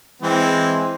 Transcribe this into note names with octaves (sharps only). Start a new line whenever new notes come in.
E3 G#3 C4